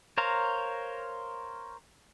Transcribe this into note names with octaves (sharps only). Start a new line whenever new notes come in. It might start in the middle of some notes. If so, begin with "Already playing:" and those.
A#4 C5 C#5 F5 A#5